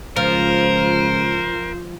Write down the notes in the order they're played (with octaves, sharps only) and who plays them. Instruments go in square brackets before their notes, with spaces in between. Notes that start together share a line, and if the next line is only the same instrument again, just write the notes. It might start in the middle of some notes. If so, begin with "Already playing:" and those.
[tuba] C#2 [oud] F3 [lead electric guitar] A#4 [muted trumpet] C5